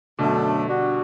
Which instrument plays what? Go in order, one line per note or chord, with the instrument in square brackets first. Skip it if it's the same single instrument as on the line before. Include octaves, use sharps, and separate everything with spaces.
[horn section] F#2 F#3 A3 D4 A4 [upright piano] B2 D3
[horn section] G3 D4 F#4